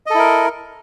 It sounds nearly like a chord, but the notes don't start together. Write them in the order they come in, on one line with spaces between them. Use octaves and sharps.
D#5 A4 E4 A#4